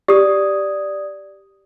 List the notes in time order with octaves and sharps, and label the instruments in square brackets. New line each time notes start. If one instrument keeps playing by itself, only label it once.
[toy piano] G4 [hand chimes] D5 D#6